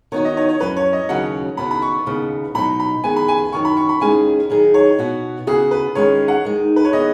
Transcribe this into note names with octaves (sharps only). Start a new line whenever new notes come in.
D#3 B3 D#4 F#4 C#5
D#5
C#5
C#5
F#2 F#3 C#4 B4
C#5
D#5
D#2 C#3 F#3 C#4 F#4 F#5
D#2 C#3 B3 F#4 B5
B5
C#6
D#2 C#3 B3
B2 F#3 D#4 B5
B5
D#3 B3 G#4 G#5
B5
G#5
F#2 D#3 F#3 C#6
B5
C#6
B5
D#2 D#3 G#3 C#4 G#4 G#5
D#3 F#3 D#4 G#4
C#5
B2 B3 F#4
C#3 B3 F#4 G#4
B4
D#3 G#3 C#4 G#4 C#5
F#5
D#2 D#3 G#3 D#4
B4
C#5
D#3 B3 G#4 D#5